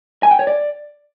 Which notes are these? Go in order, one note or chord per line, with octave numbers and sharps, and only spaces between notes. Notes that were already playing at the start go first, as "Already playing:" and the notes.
G#5
G5
C#5
D5